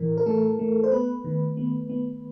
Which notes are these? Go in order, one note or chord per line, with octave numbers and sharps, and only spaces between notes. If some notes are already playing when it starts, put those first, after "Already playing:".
Already playing: A2 E3 A#4
A#4
A3 A4
A3
C5
B3 B4
D#3
B3
B3